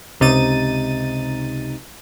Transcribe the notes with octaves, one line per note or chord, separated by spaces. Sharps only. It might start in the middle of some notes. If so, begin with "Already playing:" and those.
C#2 C3 D#4 A6 D#7